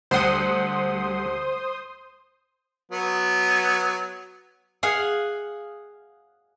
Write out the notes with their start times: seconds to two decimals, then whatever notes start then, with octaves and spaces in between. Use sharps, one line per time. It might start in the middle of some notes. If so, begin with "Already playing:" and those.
0.11 D2 G3 C5 F#5 C6 D#6
2.91 F#3 B3
4.83 G#4 F5 F#5